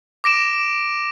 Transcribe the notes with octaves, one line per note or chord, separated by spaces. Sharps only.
D6 A#6 D7 E7